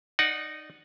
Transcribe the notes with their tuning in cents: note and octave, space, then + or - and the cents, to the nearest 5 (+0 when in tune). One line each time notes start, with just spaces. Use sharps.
D#4 -15 D5 +0 F#5 -5